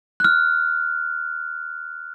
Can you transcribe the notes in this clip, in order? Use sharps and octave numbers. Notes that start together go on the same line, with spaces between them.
F6 F#6